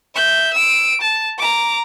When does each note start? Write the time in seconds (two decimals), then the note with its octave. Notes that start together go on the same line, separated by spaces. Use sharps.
0.15 E5 G6
0.54 E6 D7
1.01 A5
1.38 A#5 D6